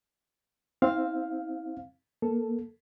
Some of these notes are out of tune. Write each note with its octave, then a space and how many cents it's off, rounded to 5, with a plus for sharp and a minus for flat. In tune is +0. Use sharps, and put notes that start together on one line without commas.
C4 +0 E4 -40 F5 +0
A#3 +10 A4 +0